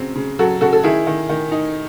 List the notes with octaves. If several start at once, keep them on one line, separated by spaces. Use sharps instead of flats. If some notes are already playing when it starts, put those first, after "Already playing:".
Already playing: C#3 F#3 C4
C#3
F#3 F#4 A4
C#3 F#4 A4
A4
D#3 E4 G#4
D#3
D#3
D#4